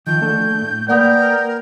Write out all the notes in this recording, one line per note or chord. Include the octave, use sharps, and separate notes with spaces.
D#3 F3 G6
A3 D4 A4
A2
A#3 A#4 B4 D5 F#5 G5 D#6